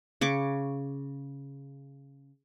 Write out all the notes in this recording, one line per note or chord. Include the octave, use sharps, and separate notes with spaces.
C#3 C#6 D6